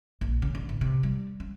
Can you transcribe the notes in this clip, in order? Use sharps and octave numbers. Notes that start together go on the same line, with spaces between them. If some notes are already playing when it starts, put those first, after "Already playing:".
A#1
C#3
D3
A1
C3
G3
C#4